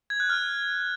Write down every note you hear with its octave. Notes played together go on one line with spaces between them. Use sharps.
G#6
F#6
F6